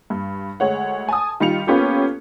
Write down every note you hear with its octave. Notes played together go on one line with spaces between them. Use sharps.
G2
D2 G#3 C#5 F#5
G#5 A5 D#6
D#3 G3 F4 C#7 F7
A#3 B3 C#4 F4 G4 A4